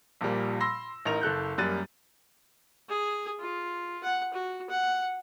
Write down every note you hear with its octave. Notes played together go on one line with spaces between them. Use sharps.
A#1 A#2 F3 G3 A#3
B5 C6 E6 A#6
A1 D#4 A#4 F7
F#1 A4 F#6 G6
F#2 G3 A#3 F#6 A6 D#7
G#4
F4
F#5
F#4
F#5